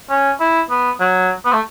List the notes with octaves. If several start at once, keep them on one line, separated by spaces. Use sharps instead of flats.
C#4
E4
B3
F#3
B3
A3